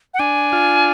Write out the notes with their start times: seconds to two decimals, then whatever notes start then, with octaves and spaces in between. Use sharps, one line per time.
0.14 F#5
0.19 D4 G#5
0.52 F4